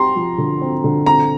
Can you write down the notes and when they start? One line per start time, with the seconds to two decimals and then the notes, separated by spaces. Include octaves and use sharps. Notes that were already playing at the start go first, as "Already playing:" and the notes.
Already playing: C4 G4 A#5 C6
0.16 F3
0.38 D3
0.61 C4
0.84 D3
1.06 C4 A#5